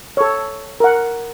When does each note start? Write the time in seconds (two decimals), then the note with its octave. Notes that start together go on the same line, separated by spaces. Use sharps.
0.17 A4 C#5
0.80 A#4 F#5